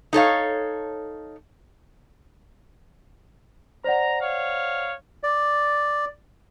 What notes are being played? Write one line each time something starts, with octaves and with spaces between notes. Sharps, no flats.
D#4 A4 C#5 F5
C5 D5 F#5 A#5
C#5 F5
D5